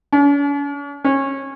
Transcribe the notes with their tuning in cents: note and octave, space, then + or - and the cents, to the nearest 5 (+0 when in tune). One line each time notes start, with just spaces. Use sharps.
C#4 +45
C#4 -25